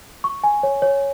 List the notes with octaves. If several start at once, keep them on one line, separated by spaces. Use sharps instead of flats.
C#6
G#5
C#5
C#5